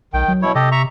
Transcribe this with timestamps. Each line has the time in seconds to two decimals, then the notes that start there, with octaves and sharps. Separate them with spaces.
0.13 B1 D#3 G5
0.28 F#3
0.42 B2 E4 C#5
0.55 C3 G4 A4 D#5
0.72 E5 A#5 C#6